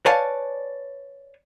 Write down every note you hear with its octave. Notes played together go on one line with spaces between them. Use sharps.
B4 C#5 D5 F5 G#5 A5